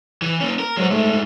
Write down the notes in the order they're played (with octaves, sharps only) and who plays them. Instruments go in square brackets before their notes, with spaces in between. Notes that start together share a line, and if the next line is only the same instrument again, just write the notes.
[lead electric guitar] E3
A#3 C#4
A#4
[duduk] F#3 [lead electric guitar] G#3 C5
[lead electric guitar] G2 G#3 [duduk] A3